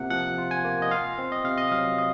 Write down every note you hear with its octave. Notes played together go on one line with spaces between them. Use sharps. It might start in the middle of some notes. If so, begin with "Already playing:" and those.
Already playing: C3 A#3 F4 F#5
F3 F#5
F4
G#5
A#3
D#5
F4 F5
C4
D#5
C3 F5
D#5
F#3 F5
D#5